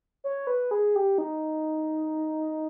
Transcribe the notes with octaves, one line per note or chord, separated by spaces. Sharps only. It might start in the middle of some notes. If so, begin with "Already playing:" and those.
C#5
B4
G#4
G4
D#4